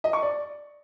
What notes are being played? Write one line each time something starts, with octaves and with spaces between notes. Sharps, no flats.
D#5
C#6
D5